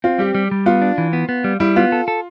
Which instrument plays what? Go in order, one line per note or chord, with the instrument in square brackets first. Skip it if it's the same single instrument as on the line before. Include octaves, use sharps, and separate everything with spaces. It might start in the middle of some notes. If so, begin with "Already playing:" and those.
[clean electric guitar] C4 [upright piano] F4
[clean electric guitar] G3 [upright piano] G4
[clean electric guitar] G3
G3
[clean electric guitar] B3 [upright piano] F4
[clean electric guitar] D4
E3
B3
B3
G3
[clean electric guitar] G3 [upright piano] E4
[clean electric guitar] B3 [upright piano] F4
[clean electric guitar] A4
A4